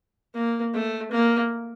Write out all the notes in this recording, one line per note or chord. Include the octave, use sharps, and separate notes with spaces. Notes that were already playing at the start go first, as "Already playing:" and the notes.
A#3
A3
A#3